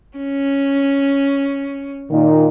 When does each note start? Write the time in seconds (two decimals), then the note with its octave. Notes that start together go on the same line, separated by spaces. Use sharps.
0.17 C#4
2.11 A#2 D#3 D#4